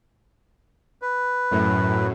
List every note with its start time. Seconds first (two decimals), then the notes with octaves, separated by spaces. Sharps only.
1.02 B4
1.51 F#2 A2